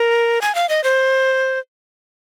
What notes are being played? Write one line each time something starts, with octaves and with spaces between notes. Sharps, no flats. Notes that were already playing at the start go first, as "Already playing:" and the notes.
Already playing: A#4
G#5
F5
D#5
C5